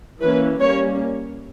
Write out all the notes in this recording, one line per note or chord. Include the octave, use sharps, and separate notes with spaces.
E3 A#3 C#4 B4
G3 A#3 C#4 C#5